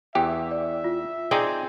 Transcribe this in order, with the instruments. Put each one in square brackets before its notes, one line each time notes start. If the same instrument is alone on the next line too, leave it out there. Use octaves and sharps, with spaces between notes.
[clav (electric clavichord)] E2 E3 G4 [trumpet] E5 [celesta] G5
[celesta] D5
F4
[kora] C4 G#4 [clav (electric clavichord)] D#4 D5 G5